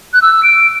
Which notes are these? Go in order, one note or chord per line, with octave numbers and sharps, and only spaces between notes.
F#6
E6
D7